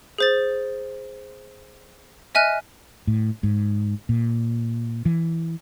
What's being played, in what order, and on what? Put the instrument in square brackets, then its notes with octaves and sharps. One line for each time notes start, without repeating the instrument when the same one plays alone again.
[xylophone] G#4 C5 A6
D#5 E5 G#5 F6 F#6
[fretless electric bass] A2
G#2
A#2
E3